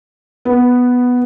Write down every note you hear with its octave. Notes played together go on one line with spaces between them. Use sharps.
B3